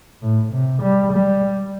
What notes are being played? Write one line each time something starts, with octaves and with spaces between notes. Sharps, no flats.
A2
C3
G3
G3